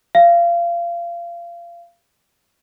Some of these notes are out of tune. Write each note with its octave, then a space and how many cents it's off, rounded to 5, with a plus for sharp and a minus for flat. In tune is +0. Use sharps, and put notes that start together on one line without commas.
F5 -25